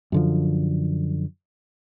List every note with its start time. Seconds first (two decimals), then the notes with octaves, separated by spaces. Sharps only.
0.12 F#2 D3 F3